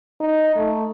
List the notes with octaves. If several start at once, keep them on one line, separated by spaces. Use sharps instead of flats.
D#4
A3